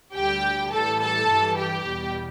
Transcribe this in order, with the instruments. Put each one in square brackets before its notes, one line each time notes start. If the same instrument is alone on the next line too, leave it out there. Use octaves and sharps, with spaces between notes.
[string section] D2 D3 G3 G4 G5
A2 E3 G3 A4 A5
A4 A5
G2 E3 G3
G4 G5
E2 B2 G3